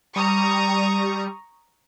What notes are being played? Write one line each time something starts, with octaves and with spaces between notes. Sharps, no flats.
G3 A#5 C#6 D#6